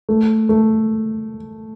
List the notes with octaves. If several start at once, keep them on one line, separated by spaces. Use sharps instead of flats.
A3
A3